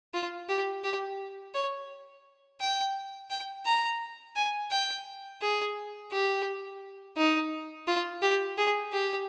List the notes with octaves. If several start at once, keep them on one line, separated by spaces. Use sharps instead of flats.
F4
G4
G4
C#5
G5
G5
A#5
G#5
G5
G#4
G4
D#4
F4
G4
G#4
G4